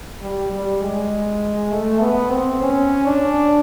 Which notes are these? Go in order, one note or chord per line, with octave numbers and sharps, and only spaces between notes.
G3
G3
G#3
A3
B3
C4
C#4
D4